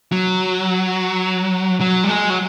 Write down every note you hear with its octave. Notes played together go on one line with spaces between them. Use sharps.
F#3
F#3
G3
G#3
F#3